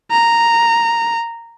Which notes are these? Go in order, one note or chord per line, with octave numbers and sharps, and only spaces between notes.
A#5